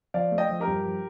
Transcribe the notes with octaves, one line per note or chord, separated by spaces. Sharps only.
F3 D5 F5
A3
D#5 G5
F3
G4 A#4
G2
F3